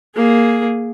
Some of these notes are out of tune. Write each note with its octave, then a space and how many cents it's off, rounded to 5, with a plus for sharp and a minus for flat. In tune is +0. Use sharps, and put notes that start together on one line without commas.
A#3 +0 G#4 +0